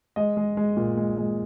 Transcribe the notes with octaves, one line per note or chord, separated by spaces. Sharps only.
G#3 D#5
G#3
G#3
A#2
G#3
G#3